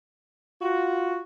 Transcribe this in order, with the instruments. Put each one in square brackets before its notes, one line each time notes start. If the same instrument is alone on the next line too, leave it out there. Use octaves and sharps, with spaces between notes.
[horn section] F4 F#4